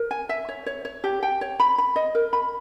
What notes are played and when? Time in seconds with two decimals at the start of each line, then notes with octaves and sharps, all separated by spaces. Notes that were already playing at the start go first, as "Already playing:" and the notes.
Already playing: A#4
0.11 G#5
0.29 E5
0.49 C#5
0.66 C#5
0.85 C#5
1.04 G4
1.23 G5
1.41 C#5
1.60 B5
1.78 B5
1.96 D#5
2.15 A#4
2.33 B5